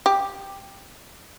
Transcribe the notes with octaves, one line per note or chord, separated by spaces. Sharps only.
G4